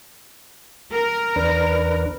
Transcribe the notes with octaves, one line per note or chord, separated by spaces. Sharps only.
A#4
E2 D4 B4